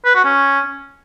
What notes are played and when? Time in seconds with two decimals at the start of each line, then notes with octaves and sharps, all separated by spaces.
0.05 B4
0.15 F#4
0.24 C#4